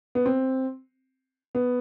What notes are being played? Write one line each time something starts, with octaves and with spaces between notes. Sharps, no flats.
B3
C4
B3